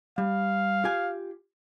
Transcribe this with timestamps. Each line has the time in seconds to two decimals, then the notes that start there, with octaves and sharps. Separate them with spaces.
0.18 G3 F5
0.84 F4 G4 G#5